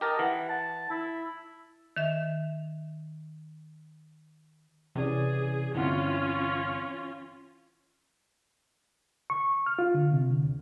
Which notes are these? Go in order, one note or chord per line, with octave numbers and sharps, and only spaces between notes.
G4 A#4 D#5 A5
E3 F#5
A5
E4
D#3 E5
C3 E3 C#4 G#4 D5
G1 C4 C#4 E4 F4 F#5
C#6
F6
F4
D3
C3
D3
D2